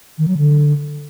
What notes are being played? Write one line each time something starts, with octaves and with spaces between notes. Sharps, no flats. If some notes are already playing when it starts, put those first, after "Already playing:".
D#3
F#3
D3